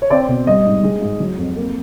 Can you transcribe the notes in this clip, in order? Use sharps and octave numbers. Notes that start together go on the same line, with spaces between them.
C#5
C4 D5
B2
G3 D#5
G#2
G#3
G#2
F#3
F2
A#3